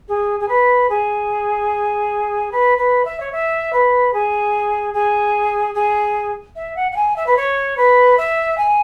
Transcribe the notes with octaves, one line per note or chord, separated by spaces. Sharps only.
G#4
G#4
B4
G#4
B4
B4
E5
C#5
E5
B4
G#4
G#4
G#4
E5
F#5
F#5
G#5
E5
B4
C#5
B4
E5
G#5